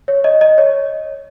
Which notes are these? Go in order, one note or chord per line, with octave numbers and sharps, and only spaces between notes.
C#5
D#5
D#5
C#5